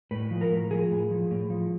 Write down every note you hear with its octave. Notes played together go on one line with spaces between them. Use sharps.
A2 B4
F3
A#4
A2
F3 G#4
A2
F3
A2
F3